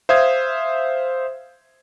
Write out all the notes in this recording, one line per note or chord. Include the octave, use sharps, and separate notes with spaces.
C5 E5 F5 D#6 G#6